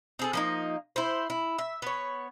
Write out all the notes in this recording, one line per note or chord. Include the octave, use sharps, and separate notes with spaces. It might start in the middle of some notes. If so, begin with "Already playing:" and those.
C4 G#4 A4
F3 A#3 D#4
E4 C5
E4
E5
B3 C#5